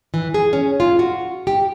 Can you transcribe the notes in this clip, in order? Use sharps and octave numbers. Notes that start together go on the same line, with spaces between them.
E3
G#4
C#4
F4
F#4
G4